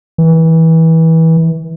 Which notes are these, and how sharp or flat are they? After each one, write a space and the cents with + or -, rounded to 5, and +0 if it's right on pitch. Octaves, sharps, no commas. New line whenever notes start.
E3 -25